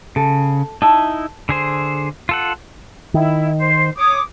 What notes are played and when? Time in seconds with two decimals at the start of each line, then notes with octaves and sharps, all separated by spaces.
0.16 C#3 A4
0.82 D#4 E4 A5
1.49 D3 G#4 C5
2.29 F4 A4 F#5
3.14 D#3 E4
3.57 C5
3.96 C#5 D6 D#6